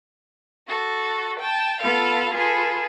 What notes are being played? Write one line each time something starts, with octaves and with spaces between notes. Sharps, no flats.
F#4 A4
G5 A5
B3 F4 A4 F5
F4 G#4 A4 B4